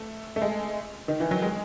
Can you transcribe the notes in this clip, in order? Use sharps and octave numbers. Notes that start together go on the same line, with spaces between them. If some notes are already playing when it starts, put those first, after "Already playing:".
Already playing: A3
A3
G#3
D#3
E3
F#3
G#3